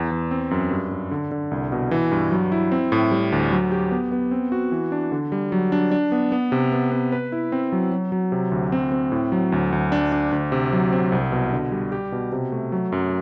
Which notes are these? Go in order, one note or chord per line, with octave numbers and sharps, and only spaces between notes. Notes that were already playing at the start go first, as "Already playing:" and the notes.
Already playing: E2
E2
C4
F#2
G2
G2
D3
D3
C2
B2
E3
G2
F#3
E4
C4
A2
G3
D2
F#3
G4
B3
B3
C4
F#4
E3
D4
D3
G3
F#3
D4
D4
B3
B3
C3
B3
B3
B4
E4
C4
F#3
F#3
F#3
C3
D2
C4
C4
A2
F#3
D2
D2
D4
D4
D2
C3
F#3
C4
C2
B2
D3
G3
G4
B2
C3
A3
F#3
F#2